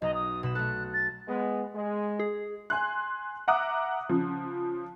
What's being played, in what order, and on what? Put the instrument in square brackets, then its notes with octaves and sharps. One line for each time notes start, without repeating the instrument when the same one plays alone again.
[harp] B1 A#5 [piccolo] D#5
[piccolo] D#6
[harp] B2 B5 E7
[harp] A3 A4 [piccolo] F#6
[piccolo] A6
[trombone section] G#3 B3
G#3
[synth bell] G#4
[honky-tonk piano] G#5 C6 F#6
E5 F#5 A#5 D6 D#6 F#6
C#3 F3